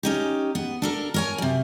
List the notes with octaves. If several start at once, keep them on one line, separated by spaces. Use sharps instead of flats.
C#4 D#4 G4
B3
D4 A4 A#4
A#4 C#5 G#5
F#2 C3